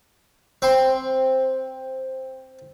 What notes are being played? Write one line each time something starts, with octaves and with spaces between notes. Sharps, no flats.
C4 C6